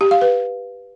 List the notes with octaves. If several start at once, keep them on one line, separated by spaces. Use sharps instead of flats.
G4
F5
B4